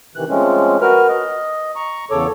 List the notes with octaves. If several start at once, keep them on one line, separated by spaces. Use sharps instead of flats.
C3 D#3 E3 F#6
F3 G#3 A3 C4 C#4
F#4 A#4 B4 F6
D#5
A#5 C#6
E2 C#3 A4 C#5 D6